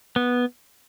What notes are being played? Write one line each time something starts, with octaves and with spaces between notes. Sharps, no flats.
B3